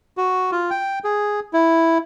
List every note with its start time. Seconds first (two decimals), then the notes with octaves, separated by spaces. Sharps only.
0.17 F#4
0.52 F4
0.70 G5
1.04 G#4
1.53 E4